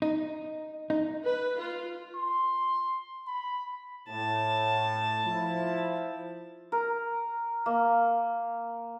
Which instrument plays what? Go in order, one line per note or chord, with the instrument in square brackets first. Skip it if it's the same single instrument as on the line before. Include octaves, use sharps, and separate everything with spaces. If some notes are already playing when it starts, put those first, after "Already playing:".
[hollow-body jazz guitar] D#4
D#4
[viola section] B4
F4
[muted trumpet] C6
B5
[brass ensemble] A2 [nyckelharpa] A5
[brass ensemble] F3 E4
[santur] A#4
A#3